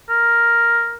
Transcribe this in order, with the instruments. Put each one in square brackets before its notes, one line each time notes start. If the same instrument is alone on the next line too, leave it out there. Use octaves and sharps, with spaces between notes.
[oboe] A#4